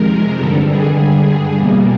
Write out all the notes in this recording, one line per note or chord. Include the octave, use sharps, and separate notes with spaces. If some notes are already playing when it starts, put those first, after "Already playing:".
Already playing: F2 C3 D#3 G#3 A#4
G2 D3 G3 A4
G#4
E2 B2 G3 A#3